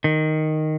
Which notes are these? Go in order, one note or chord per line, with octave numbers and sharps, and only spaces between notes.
D#3